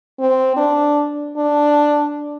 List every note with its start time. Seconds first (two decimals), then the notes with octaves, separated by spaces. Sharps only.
0.19 C4
0.56 D4
1.37 D4